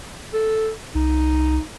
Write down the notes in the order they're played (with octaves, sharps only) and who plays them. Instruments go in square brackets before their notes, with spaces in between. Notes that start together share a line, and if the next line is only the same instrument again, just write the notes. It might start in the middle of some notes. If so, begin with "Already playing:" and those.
[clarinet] A4
[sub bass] C2 [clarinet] D#4